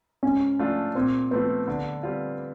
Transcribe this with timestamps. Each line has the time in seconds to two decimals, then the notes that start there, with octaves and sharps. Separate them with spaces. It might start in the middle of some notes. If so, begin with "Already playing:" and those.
0.23 G#2 C#4
0.59 F3 A3 D4 F4
0.95 A#2 C4
1.31 F3 A3 B3 C4
1.67 D3
2.03 G3 C4 F4